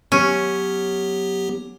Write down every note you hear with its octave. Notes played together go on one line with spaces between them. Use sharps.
F#3 B3 C#4 G4